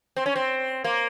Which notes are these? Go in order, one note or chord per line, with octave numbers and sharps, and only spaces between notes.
C4
C#4
C4
A#3